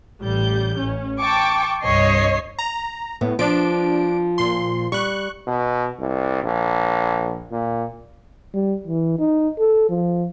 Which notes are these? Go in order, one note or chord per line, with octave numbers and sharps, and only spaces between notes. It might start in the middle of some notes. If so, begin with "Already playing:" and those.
A1 G3 G6
A1 C#4
G5 A5 C#6 D6
C2 G2 C#5 D#5 C7
A#5
A2 B3
F3 D4 D7
A#2 C6
G3 C#6 F#6
B2
C2
A#1
A#2
G3
E3
D#4
A4
F3